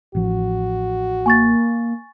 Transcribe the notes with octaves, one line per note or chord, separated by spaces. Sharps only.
A1 F3 F#4
A#3 G#5 C#6 A6